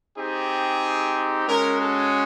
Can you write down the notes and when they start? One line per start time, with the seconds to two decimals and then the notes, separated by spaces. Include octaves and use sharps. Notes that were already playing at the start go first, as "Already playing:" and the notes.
0.16 C4 D#4 G4 G#4
1.47 G#3 C#4 F#4 A#4
1.80 A4